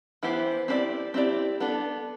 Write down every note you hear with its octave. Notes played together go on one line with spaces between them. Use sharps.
E3 B3 E4 G4 C5
C4 E4 G4 D5
C4 E4 G4 D5
B3 D4 A4